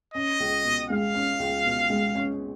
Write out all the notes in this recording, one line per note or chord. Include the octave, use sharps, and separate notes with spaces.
C#4 D#5
C#2
B2
G#3 F5
C#4
C#2
B2
G#3
C#4